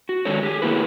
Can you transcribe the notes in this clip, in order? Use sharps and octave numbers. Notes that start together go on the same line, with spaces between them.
F#4
D3 D#3 G#3 D4 A4 C#5
G4 G#4
D#3 A3 A#3 E4 B4